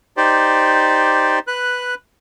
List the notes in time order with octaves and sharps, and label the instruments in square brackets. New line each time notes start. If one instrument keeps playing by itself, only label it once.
[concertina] D#4 G4 C5 D5
B4 F#6